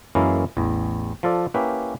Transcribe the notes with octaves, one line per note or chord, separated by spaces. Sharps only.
F#2 E3 G#3 A#3 C#4 E4
A1 E2
F3 F4 A4 D5
A#3 C#4 E4 G4 B4